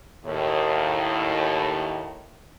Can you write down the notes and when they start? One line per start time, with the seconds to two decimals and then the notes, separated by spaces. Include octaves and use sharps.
0.25 D#2 A2